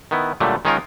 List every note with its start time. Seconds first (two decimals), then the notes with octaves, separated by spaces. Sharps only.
0.11 D#3 B3 E4
0.40 A#2 D3 F#3 G3 A3
0.65 D#3 G#3 C#4 D#4 F4 A#4